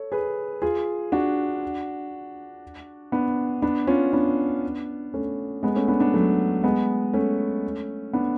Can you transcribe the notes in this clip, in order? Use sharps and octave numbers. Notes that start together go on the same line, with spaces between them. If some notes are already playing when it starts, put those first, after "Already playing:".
Already playing: A4 C#5
G#4 B4
F4 G#4
D4 F#4
B3 D4
B3 D4
C#4 F4
B3 D4
A3 C#4
G#3 B3
A3 C#4
B3 D4
B3 D4
F#3 A3
G#3 B3
A3 C#4
B3 D4